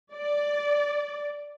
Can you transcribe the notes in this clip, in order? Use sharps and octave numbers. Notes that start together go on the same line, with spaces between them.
D5